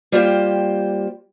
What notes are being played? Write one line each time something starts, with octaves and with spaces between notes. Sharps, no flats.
G3 A#3 F4 G4 C5 G5